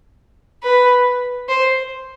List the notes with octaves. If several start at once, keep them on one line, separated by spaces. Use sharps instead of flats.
B4
C5